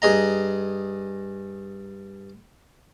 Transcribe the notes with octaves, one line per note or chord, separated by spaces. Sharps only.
G2 G#4 D#5 A#5